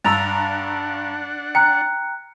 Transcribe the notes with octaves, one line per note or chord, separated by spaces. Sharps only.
G2 D4 F#5 A#5 E6 A6 F7
G5 A#5 F#6 C#7